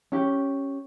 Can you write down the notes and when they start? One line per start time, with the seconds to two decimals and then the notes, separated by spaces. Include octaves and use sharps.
0.12 C#4 G4